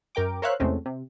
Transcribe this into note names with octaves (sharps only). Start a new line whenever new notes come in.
F#2 A#4 G5 D6
A#4 C5 C#5 E5 F5 F#6
E2 C3 G#3 A3 C4 C#4
C3